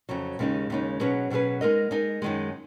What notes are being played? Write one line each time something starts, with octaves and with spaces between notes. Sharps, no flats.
F2 C#3 F#3
D#2 C#3 G#3 D#4
D#2 C#3 G#3 D#4
B2 F#3 C#4 G#4 B4
B2 F#3 C#4 G#4 B4
G#3 D#4 A#4 D#5
G#3 D#4 A#4 D#5
F#2 D#3 G#3